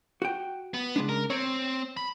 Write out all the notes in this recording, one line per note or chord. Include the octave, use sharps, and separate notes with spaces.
F#4 F#5 G5
B3
C#3 G#3 D4
A#4
C4 C#5
B5